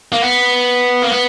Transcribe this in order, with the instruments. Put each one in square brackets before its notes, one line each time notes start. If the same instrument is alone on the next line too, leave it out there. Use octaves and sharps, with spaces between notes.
[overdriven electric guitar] A#3
B3
A#3
B3